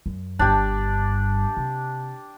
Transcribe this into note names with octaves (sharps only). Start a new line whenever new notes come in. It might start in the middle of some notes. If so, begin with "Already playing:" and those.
F#2
G1 G2 D4 G4
C3